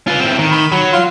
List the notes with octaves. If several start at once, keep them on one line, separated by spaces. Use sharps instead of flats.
F4 B4
A2 C4
D#3
B5
F#3
F4 C6